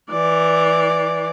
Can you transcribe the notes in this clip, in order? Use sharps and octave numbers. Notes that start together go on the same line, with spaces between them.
E3 D5